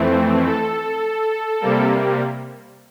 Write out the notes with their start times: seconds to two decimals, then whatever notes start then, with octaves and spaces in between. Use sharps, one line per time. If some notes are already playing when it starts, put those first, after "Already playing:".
Already playing: F2 E3 A3 C4
0.46 A4
1.60 C3 G3 A#3